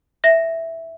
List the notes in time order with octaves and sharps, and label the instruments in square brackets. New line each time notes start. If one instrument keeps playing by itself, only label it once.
[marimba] E5 A#6